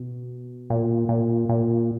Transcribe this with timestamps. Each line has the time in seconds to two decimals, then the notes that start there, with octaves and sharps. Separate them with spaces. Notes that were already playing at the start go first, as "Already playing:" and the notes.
Already playing: B2
0.70 A#2
1.09 A#2
1.49 A#2